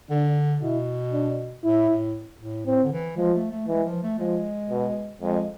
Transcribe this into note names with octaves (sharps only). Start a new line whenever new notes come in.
D3 D4
B2 E4
D4
A2 E4
A2
A2
A2 C4
D3
E3
F3 G#3
A3
A3
E3 G#3
F3
A3
F3 G#3
B2
F2 G#3